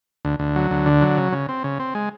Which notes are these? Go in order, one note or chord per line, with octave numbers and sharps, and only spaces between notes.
D2
D2
F#3
D2
D3
F#3
C#3
C#3
C4
C#3
C4
G#3